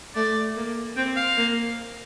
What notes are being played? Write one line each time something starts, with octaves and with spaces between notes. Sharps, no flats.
A3 D5
A#3
C4 G5
F5
A#3